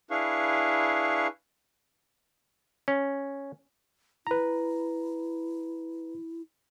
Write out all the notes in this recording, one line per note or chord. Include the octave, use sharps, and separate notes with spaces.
D4 E4 G#4 B4 F5 C#6
C#4
E4 B4 A#5